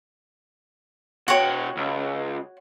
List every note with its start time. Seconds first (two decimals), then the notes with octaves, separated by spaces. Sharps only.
1.28 B2 F#4 C#5 G5
1.77 C#2